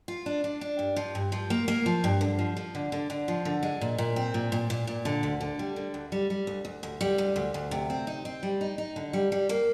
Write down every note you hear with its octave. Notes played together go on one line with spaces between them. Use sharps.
F4
D4
D4
D4
G2
F3
G2
F3
A#3
A#3
F3
G2
D3
F3
F3
D3
D3
D3
F3
D3
G#3
A#2
A#2
C4
A#2
A#2
A#2
A#2
D3
D2
D3
G3
D3
D2
G3
G3
D2
D2
D2
G3
D2
D2
D2
C3
C4
D#4
C4
G3
D#4
D#4
D3
G3
G3
A#3